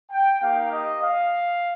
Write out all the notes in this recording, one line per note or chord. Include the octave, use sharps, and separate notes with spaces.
G5
A#3 D#4 G4 F5
D#5
F5